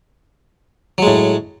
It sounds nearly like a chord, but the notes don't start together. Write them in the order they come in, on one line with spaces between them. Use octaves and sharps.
F#3 G#3 A2